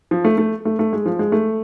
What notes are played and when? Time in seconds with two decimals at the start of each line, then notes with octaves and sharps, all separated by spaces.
0.11 F3
0.24 A3
0.38 A3
0.65 A3
0.79 A3
0.93 G#3
1.06 F3
1.19 G#3
1.32 A3